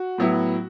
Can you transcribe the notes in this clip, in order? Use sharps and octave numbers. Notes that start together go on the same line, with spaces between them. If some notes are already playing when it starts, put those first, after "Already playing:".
Already playing: F#4
A2 F#3 B3 E4